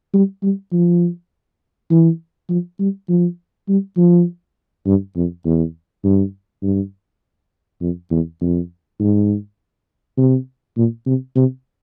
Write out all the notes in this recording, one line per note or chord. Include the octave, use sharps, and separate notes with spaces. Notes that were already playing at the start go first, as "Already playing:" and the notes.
G3
G3
F3
E3
F3
G3
F3
G3
F3
G2
F2
E2
G2
G2
F2
E2
F2
G#2
C3
A#2
C3
C3